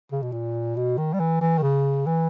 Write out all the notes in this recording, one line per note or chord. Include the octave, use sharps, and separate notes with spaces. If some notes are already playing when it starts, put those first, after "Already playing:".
C#3
B2
A#2
B2
D#3
G3
E3
E3
D#3
C#3
E3